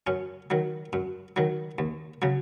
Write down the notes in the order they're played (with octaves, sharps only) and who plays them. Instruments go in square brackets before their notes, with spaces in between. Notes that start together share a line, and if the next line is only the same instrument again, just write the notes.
[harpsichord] F#2 C#4
D#3 F#3
F#2
D#3 F#3
D#2
C#3 F#3